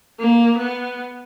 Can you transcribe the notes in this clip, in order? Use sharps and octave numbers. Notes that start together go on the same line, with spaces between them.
A#3
B3